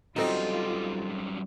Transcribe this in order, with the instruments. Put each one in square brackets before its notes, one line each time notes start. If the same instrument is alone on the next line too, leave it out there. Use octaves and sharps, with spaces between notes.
[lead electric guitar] F#2 G3 [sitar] C4 D#4 [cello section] F4 [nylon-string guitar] F#4 A4 D#5